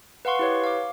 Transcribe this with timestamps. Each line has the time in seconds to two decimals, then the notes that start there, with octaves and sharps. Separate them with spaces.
0.25 B4 F5 F#5 C6 C#6
0.39 E4 G4 B4 C#5
0.64 F5 D6